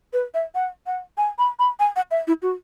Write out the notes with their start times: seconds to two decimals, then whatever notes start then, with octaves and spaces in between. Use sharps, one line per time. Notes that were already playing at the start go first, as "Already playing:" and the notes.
0.13 B4
0.34 E5
0.55 F#5
0.87 F#5
1.18 G#5
1.39 B5
1.59 B5
1.80 G#5
1.96 F#5
2.11 E5
2.27 E4
2.42 F#4